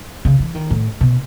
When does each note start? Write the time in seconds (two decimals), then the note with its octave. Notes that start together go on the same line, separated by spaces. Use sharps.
0.25 C#3
0.40 E3
0.55 D#3
0.70 A2
1.01 B2